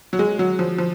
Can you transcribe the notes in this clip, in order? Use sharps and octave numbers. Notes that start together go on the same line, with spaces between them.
F#3
G#3
F#3
F3
F3